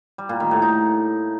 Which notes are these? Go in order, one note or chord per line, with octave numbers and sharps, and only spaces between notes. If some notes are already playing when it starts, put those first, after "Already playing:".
G3
A#2
D#3
A2
D#4